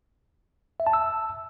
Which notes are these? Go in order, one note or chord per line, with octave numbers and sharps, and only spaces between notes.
E5
A5
E6